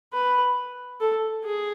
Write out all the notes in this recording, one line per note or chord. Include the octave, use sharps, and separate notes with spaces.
B4
A4
G#4